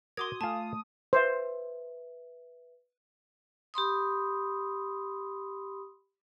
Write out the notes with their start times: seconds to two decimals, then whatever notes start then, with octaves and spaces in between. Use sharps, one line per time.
0.17 F#4 A#4 C6 D6 D#6 G#6
0.41 A3 F4 G#5 A5
1.13 B4 C5 E5
3.74 G4 B5 C6 D#6